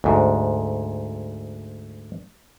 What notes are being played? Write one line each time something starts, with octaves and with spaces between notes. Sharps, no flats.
D2 G#2